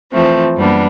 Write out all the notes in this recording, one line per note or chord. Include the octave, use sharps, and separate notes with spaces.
E3 F3 A3 C4
F#2 E3 G3 A#3 B3 D4